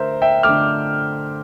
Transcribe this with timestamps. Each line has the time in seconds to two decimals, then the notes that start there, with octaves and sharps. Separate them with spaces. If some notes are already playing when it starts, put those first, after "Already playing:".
Already playing: D3 A3 A#4 C5 E5
0.22 E5 G5
0.43 D3 A3 D6 F6